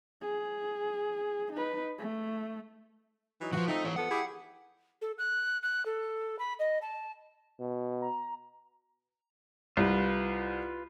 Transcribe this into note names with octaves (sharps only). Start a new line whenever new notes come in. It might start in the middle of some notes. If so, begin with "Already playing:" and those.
G#4
D#4 B4
A3
E3 F#3 D#4
D#3 F3 F#4 B4
A3 C4 D#4 F4
E3 C#5
F3 B3 A4 F#5
E4 G4 G#4
A4
F#6
F#6
A4
B5
D#5
A5
B2
A#5
C2 F4 B4